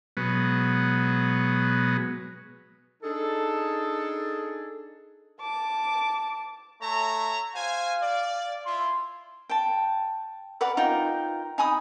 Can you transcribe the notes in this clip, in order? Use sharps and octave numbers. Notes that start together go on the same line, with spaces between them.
B2 F#3 G#3 B3
D4 D#4 G#4 A4
A5 D6
A3 C#5 E5 A#5
F#4 C5 F5 G#5
D5
E4 F4 C6
G5 A5
A#4 B4 D5 F#5
D#4 F4 A#4 G5
D#4 G#5 B5 D#6